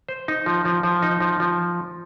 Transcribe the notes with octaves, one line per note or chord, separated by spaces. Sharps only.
C5
D#4
F3
F3
F3
D#4
F3
F3